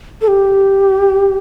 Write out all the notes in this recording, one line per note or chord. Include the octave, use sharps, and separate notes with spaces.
A4
G4